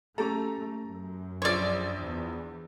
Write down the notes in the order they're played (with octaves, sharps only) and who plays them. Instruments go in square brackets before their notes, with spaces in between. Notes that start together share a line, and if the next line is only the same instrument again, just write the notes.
[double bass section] A3 [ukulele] C#4 G4 A4 [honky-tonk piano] A#5
[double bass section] F#2
[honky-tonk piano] A#1 F3 C6 [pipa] C#5 D5
[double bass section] E2